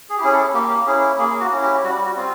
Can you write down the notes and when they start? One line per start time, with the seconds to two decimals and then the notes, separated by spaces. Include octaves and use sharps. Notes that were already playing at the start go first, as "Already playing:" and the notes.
0.10 G#4
0.17 G4
0.20 C#4 E4 G#4
0.32 A4
0.54 A#3 G4
0.70 G4
0.86 C#4 E4 G#4
1.18 A#3 G#4
1.40 F#4
1.51 C#4 E4
1.63 G4
1.84 G3 F#4
2.05 F#4
2.17 C4 F4